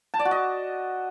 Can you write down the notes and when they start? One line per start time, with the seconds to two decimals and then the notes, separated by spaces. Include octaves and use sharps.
0.14 A5
0.19 D5
0.25 F#4
0.31 D#5